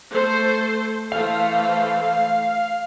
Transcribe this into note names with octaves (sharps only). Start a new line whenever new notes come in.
A3 A4 C5
E3 A3 C5 F5